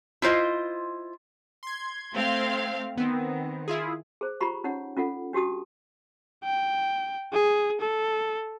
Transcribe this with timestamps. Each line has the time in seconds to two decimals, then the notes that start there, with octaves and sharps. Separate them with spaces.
0.22 E4 F4 C5 D#5
1.63 C6 G#6
2.13 A3 C4 F5
2.98 D#3 B3 C4
3.68 E4 F4 G#4
4.21 G#4 C5
4.40 F4 G4 A#5 B5 C#6
4.64 C#4 D#4 C#5 F#5
4.97 C#4 F4 A4 F#5
5.33 D4 F#4 G4 A5 D#6
6.44 G5
7.33 G#4
7.80 A4